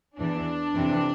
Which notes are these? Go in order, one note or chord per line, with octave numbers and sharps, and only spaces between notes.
E2 E3 D4
F2 C3 E3